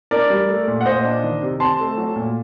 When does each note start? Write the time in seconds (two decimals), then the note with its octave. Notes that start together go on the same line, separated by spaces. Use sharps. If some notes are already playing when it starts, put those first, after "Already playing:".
0.11 D4 A#4 D5
0.30 G3
0.49 A3
0.68 A#2
0.81 F#5
0.85 A#2 C5 D#5
1.04 D4
1.24 D#3
1.42 C3
1.60 C4 A5 C6
1.79 A3
1.97 F#3
2.16 A#2